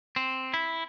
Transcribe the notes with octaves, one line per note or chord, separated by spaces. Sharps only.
C4
E4